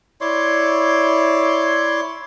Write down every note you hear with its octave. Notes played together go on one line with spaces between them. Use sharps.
E4 C#5 D5 C6